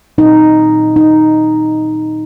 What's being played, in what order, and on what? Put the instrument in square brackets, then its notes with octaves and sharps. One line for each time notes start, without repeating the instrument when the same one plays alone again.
[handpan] A#2 F#3 C4 D#4
D#4